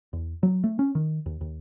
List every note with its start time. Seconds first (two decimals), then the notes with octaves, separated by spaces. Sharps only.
0.13 E2
0.43 F#3
0.64 A3
0.79 C#4
0.95 D#3
1.26 D#2
1.41 D#2